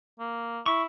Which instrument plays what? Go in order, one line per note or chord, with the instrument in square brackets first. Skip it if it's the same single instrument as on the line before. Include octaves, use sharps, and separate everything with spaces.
[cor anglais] A#3
[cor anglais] E4 [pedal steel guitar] C#6